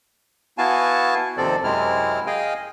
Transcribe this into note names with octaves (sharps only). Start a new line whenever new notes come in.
B3 E4 F#4 F5 G#5 A5
D#2 C3 F3 C4 A4 D5
F#2 C3 G#3 C4 E4 F6
G#4 D#5 F5 G5 G#5